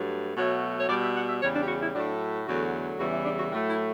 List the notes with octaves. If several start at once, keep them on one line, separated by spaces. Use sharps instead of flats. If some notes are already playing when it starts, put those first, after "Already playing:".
Already playing: G2 F#3 A3
B2 F#3 A3 C#5
C#5
B2 G3 D5
E5
F#5
E5
E2 C#3 G3 C#5
D4
G4
F#4
E4
A2 F#3 A3 D4
E2 D3 F#3 A3 F#4
E2 C#3 E3 G3 F#4
E4
D4
F#4
A2 F#3 A3
E4